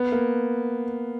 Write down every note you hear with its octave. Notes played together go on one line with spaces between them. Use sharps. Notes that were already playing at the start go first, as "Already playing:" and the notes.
Already playing: B3
A#3